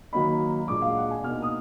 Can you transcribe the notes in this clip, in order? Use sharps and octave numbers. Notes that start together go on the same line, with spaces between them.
D#3 F#3 A#3 D#4 B5
A#2 G#3 D4 D6
F5
F#5
G#5
B2 A#3 D#4 F6
D#6